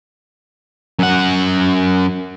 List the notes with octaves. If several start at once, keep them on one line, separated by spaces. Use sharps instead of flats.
F#2 F#5